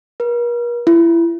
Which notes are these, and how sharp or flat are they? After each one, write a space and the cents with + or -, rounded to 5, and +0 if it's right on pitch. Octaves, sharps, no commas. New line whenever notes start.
A#4 +45
E4 +25